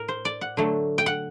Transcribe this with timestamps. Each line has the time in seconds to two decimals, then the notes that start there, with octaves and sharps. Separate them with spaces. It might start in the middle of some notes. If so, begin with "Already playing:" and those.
Already playing: A2 A#4
0.08 C5
0.25 D5
0.41 F#5
0.57 D3 F#3 A3
0.98 G5
1.06 F#5